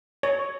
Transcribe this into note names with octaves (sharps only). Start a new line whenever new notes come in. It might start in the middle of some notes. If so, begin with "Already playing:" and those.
C#5